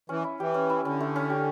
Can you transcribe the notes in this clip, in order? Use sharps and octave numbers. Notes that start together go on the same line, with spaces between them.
E3 C#4
E4
E3 G4
C#4
E4
D3 C#4
A3
C#4
G4